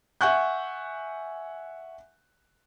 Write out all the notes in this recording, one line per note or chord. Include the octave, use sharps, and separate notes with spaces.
E5 F#5 G#5 C#6 F#6 G6